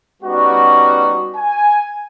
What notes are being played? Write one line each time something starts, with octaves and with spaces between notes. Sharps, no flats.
G3 B3 C#4 D#4 F#4
G#5